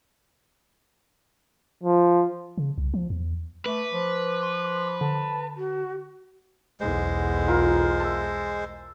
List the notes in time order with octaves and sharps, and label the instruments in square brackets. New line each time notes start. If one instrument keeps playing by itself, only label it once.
[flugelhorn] F3
[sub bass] C#3
C2
F3
E2
[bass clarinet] A3 [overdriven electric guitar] B4 [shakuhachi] D6
[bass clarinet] F3
[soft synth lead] C6
[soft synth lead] D3 [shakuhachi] A5
[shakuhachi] F#4
[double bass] B1 E2 [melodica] G#3 C5
[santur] F4 A#4
E5 A5